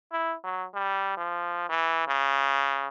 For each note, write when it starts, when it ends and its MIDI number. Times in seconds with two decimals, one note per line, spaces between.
0.12 0.35 64
0.44 0.64 54
0.74 1.17 55
1.17 1.67 53
1.69 2.04 52
2.08 2.88 49